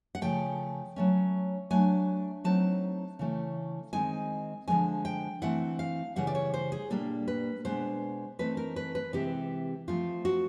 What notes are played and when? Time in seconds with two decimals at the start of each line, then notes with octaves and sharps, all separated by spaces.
0.15 F#5
0.22 C#3 F3 A3 G5
0.96 F#3 A3 C#4
1.70 F#3 A3 D4 G#5
2.44 F#3 A3 C4 D#4 A5
3.19 C#3 E3 A3
3.93 D#3 G#3 C4 D#4 G#5
4.68 D3 F3 G#3 C#4 G#5
5.05 G5
5.42 E3 A3 C4 E4 F#5
5.79 F5
6.16 C#3 E3 G3 F#5
6.27 D5
6.35 C#5
6.54 C5
6.72 G#4
6.90 A#2 G3 A#3 D4 A4
7.28 B4
7.65 B2 G#3 B3 D4 C5
8.39 E3 A3 C4 D#4 B4
8.57 A#4
8.76 B4
8.95 B4
9.13 C3 E3 G#3 C4 G4
9.88 F3 A3 C4 F4
10.25 F#4